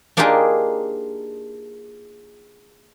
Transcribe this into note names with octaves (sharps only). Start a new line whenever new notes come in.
A#3 D4 D#4 F4 G4 G#4